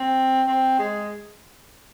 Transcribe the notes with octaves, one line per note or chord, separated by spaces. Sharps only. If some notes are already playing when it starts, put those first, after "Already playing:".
Already playing: C4
C4
G#3